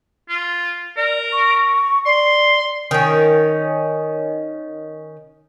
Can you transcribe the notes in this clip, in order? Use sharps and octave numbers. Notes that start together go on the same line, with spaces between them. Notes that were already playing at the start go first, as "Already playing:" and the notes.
F4
A#4 D5
C#6
D5 C6
D#3 C#4